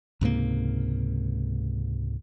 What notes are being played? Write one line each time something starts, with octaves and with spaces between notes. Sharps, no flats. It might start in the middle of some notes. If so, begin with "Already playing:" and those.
C#2 G#2 C3 A#3